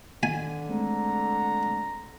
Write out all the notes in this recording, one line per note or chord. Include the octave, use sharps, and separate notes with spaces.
D3 D#3 G#5
G#3 A3 C4 A#5